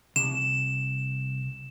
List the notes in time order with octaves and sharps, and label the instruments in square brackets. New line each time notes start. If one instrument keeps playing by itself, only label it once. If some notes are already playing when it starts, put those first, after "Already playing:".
[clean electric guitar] C2 [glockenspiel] E7